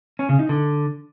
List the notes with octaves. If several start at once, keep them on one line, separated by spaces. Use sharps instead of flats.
C#4
C#3
D#4
D3